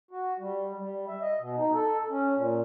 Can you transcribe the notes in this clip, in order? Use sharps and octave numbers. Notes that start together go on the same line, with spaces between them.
F#4
G3
G3
E5
D#5
B2
D#4
A4
C#4
A#2